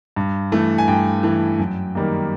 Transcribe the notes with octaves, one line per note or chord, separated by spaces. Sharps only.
G2
E3 A3
G#5
G2 G5
E3 A3
F#2
D#3 G3 A#3